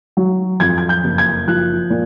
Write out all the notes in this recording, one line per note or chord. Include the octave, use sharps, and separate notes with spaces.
F#3
F2 G#6
G#6
G6
F#1
G#6
F3 F#6
A#2